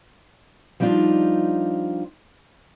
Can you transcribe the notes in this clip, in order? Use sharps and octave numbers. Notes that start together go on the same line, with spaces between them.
F3 G3 D4 D#4 F4